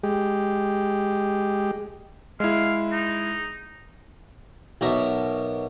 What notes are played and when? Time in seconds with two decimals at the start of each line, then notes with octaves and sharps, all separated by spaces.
0.03 G#3 G4
2.40 G#3 E4 F5
2.92 D#4
4.81 B1 B2 A#4 E5